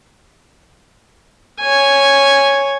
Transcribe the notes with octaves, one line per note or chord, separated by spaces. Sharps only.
C#5 G#5